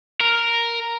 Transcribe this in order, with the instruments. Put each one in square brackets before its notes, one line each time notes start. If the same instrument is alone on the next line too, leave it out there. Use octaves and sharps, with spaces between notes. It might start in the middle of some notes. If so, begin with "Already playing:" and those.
[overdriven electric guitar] A#4